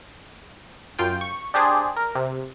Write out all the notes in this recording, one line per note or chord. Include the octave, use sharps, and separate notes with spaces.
F#2 F4 G5
C#6
D4 G4 G#4 C5 D5
A#4
C3